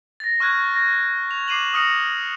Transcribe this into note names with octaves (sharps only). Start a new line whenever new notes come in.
A6 A#6
C#6 F6 F#6 G#6
A#6
F7
D6 C7 D#7 E7 F#7
D#6 F6 A#6 C#7